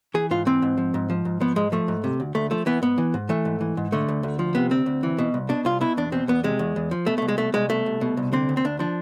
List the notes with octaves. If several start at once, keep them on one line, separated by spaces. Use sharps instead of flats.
E3 G#4
G#2 F4
E3 C4
G#2
F3
G#2
F3
G#2
F3 B3
G#2 G#3
F3 A3
G#2
C3
D2
D2 A3
F3 A3
E3 B3
G#2 B3
E3
G#2
E3 A3
G#2
E3
G#2
D3 A3
D2
D2
F3
C3 B3
D2 C4
D2
E3
B2
C2
B2 D4
C2 F4
B2 E4
E2 D4
B2 C4
E2 B3
C3 G#3
E2
E2
F3
B2 A3
A3
C2
G#3
B2 A3
C2 G#3
B2 A3
C2
B2
C2
D3 C4
D2
C4
D2 D4
F3 D4